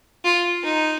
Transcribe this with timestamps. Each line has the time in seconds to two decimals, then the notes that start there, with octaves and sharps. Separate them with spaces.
0.24 F4
0.63 D#4